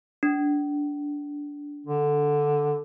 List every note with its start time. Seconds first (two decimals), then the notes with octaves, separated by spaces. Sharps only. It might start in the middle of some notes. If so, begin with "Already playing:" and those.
0.23 D4
1.86 D3